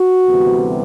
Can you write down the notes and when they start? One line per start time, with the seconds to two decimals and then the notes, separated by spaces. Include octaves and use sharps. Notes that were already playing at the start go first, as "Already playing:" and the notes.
Already playing: F#4
0.26 D2 C3 E3 G3 B3